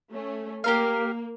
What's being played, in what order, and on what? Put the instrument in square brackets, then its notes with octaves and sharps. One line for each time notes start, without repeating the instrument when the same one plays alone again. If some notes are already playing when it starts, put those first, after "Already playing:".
[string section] A3 C#4
[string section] A#3 [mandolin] G4 A#4 F5